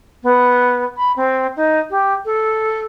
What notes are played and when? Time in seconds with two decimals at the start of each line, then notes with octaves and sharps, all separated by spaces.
0.23 B3
0.97 B5
1.16 C4
1.56 D#4
1.90 G4
2.25 A4